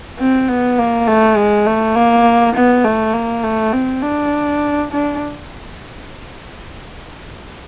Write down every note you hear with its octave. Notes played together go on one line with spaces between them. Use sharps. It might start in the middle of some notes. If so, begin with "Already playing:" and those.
C4
B3
A#3
A3
G#3
A3
A#3
B3
A3
A#3
A3
C4
D4
D4